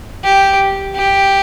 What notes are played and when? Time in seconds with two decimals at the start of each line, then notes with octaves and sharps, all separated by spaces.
0.24 G4
0.96 G4